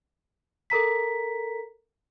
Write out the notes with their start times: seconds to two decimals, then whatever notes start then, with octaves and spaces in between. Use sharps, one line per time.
0.70 A4 A#4 A#5 B6